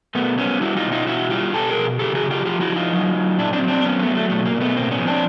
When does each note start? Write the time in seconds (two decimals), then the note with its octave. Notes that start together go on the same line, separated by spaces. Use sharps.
0.15 B2 A3 B3
0.38 G3 B3 C#4
0.61 G3 E4 F#4
0.77 D#4 F4
0.85 B2
0.92 D#4 F4
1.07 B2 E4 F#4
1.30 G3 F4 G4
1.54 B2 G4 A4
1.69 G#4 A#4
1.77 B2
1.99 C#3 G4 A4
2.15 F#4 G#4
2.23 C#3
2.31 F4 G4
2.45 F3 F4 G4
2.61 E4 F#4
2.69 F3
2.76 D#4 F4
2.93 F#3
3.14 F#3
3.38 A#2 D4 E4
3.53 C4 D4
3.61 F#3
3.68 C4 D4
3.84 F#3 B3 C#4
3.99 A3 B3
4.07 F#3
4.15 A3
4.30 B2 A3
4.45 A#3
4.54 B2
4.61 A3 B3
4.76 A2 A#3 C4
4.91 B3 C#4
4.99 F3
5.07 C4 D4